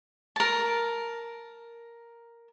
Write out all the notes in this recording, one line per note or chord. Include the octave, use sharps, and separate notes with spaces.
A#4 A5